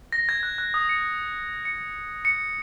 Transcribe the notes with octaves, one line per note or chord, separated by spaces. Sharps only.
A#6
G#6
F#6
F#6
D#6
C#7
C#7
C#7